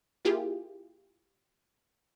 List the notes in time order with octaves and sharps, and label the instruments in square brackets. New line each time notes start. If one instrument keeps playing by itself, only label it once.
[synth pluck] A#3 E4 F4 G4 G#4